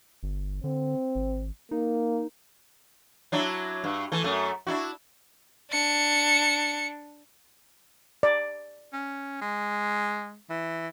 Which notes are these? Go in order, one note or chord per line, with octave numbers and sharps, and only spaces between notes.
G1
D3 C4
G#1
A#3 D#4
F#3 D4 E4
G2
E3 A3
F#2 A3
D4 E4 F#4
D4 C#7
D5
C#4
G#3
E3